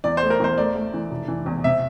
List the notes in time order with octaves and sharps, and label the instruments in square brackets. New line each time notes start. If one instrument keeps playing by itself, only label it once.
[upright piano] E2 [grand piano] D5
[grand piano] C5
[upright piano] A3
[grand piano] A#4
[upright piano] E2 [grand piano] C5
[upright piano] A3 [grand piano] D5
[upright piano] A3
E3
F1
E3
E2
[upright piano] C3 [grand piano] E5